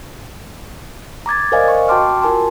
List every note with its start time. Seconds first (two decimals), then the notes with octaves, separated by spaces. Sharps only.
1.26 A#5 D6 G#6 A6
1.52 A#4 C5 D5 D#5 F5 G#5
1.64 D#5 C#6
1.88 F#4 G5 A5 C6 D6 F6
2.22 F4 F#4 A#4 G#5 A5 C6